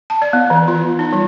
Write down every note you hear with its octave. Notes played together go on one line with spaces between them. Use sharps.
A5
D5
B3
E3
F4
D#4
G3